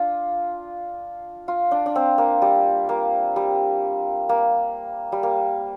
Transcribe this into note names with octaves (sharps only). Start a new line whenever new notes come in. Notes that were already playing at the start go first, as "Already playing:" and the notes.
Already playing: D4 F4
F4
D4
D4
C4
A#3
G3
A#3
G3
A#3
G3
A#3